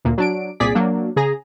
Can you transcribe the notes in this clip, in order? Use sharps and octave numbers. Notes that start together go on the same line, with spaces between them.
D2 A#2 A#3
F#3 D4 D7
C2 A#2 G#4 D5 B6
F#3 A#3 D4
C#3 G#4 A#5